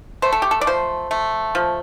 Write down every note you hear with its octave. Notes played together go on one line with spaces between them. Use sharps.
A3 C5
A4
G4
A4
D5
F3 C5
A3
F3